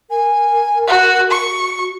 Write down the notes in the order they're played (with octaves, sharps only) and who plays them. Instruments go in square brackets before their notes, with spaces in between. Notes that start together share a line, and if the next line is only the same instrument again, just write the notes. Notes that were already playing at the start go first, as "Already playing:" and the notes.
[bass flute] A#4 [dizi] G#5
[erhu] F#4 [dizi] F#5
[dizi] F#4 [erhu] C#6